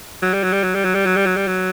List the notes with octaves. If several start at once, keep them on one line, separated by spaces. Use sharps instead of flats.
F#3
G3
F#3
G3
F#3
G3
F#3
G3
F#3
G3
F#3
G3
F#3